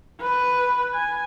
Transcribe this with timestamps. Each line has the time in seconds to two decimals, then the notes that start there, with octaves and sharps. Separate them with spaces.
0.20 B4
0.94 G#5